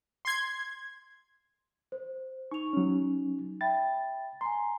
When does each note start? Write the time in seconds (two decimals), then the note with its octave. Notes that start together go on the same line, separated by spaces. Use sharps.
0.25 C6 G#6
1.92 C5
2.51 D#4 C#6 F7
2.73 F#3 C#4
3.61 E5 G5 B5 A6
4.41 G#5 A#5 C6